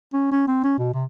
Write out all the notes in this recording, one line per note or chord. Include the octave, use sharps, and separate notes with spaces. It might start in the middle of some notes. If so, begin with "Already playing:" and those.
C#4
C#4
C4
C#4
B2
C3